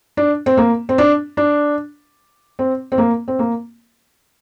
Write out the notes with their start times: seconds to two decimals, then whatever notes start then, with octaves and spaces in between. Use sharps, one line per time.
0.17 D4
0.46 C4
0.57 A#3
0.89 C4
0.98 D4
1.37 D4
2.59 C4
2.92 C4
2.98 A#3
3.28 C4
3.39 A#3